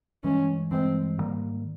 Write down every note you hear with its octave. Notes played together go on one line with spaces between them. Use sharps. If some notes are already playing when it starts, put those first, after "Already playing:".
G2 E3 G#3 C#4
G2 E3 G#3 C4
G#2 D#3 G3 A#3